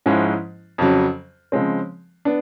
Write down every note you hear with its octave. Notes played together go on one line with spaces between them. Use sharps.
G#2 F3 G#3 C#4 E4
F2 C#3 F#3
C#3 F3 G#3 C4
B3 D4